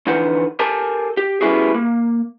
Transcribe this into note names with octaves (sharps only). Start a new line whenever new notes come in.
F2 D3 E3 D#4 B4 F#5
G4 A4 A#4 G#5 A5
G4
G3 B3 C#4 E4 F#4 G#4
A#3